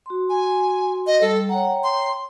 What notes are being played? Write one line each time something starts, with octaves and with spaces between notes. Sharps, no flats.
F#4 C6
G#5
D#5
G3 A4
C#5 F#5 G5 A#5
C6